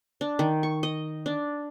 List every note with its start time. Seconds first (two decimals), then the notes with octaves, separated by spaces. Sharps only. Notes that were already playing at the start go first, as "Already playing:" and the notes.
0.21 D4
0.39 D#3
0.63 C#6
0.83 D#5
1.26 D4